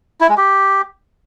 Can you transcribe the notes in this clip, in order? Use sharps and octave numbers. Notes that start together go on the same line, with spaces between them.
E4
G#3
G4